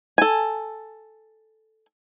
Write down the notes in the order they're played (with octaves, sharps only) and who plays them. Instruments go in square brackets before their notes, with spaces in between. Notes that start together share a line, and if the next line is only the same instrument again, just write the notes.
[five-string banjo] A4 G#5